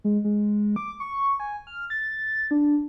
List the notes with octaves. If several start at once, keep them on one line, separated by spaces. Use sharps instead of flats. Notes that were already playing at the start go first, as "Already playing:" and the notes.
G#3
G#3
D6
C#6
G#5
F6
A6
D4